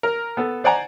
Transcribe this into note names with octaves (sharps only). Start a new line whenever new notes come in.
A#4
B3 A4
C5 D5 F#5 G#5 A#5